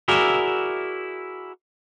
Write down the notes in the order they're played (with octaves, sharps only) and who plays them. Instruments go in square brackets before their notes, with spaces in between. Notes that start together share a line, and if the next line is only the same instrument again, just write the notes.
[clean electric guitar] E4 F#4 G#4 A#4 D5 E5